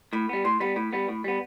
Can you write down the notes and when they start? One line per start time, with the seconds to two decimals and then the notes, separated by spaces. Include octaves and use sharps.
0.13 A2 B5
0.29 G3 B3
0.44 A2 C6
0.60 G3 B3 B5
0.76 A2 B5
0.93 G3 B3
1.08 A2
1.24 G3 B3